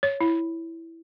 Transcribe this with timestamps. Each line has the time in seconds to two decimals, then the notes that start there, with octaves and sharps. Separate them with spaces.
0.03 C#5
0.21 E4